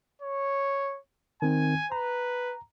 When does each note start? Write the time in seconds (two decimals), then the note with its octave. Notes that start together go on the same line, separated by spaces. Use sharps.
0.22 C#5
1.42 D#3 C4 G#5
1.92 B4 A#5